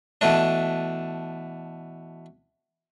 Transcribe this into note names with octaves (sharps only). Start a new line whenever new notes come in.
B2 E3 A3 D4